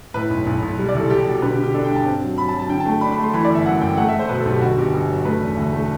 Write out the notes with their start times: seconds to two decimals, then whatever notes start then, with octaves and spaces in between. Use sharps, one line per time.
0.14 A2 B4
0.30 B1
0.46 B1
0.62 B1
0.78 G3
0.89 D5
0.94 C2
1.00 A4
1.10 C2 G4
1.26 B2
1.42 D3 B4
1.53 G4
1.58 D3
1.63 G4
1.74 D4 A4
1.85 G5
1.90 G2
1.96 A5
2.06 C4
2.22 F#3
2.38 F#3 B5
2.48 A5
2.54 F#3
2.59 A5
2.69 D3 G5
2.80 A5
2.86 A3
3.01 D4 B5
3.12 B5
3.18 A3
3.23 C6
3.33 E3 B5
3.45 D5
3.50 G1
3.55 E5
3.66 F#2 F#5
3.81 F#2 G5
3.97 A3 F#5
4.08 E5
4.14 A3
4.19 C5
4.29 B2 B4
4.40 A4
4.45 B1
4.51 G4
4.61 G1 F#4
4.77 G1 G4
4.93 G1
5.09 F#3
5.25 A3 B4
5.41 E1
5.57 D2
5.73 A3